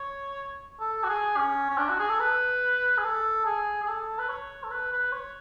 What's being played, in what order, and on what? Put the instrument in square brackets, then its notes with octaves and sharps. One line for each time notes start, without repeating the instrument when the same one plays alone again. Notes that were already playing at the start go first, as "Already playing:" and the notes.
Already playing: [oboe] C#5
A4
F#4
G#4
C#4
C#4
D4
F#4
G#4
A4
B4
G#4
A4
G#4
G#4
A4
B4
C#5
A4
B4
B4
C#5